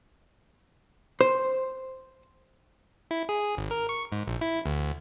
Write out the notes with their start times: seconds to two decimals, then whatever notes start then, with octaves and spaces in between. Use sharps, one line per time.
1.21 C5
3.11 E4
3.29 G#4
3.57 G#1
3.71 A#4
3.89 C#6
4.12 G#2
4.28 A#1
4.41 E4
4.66 D2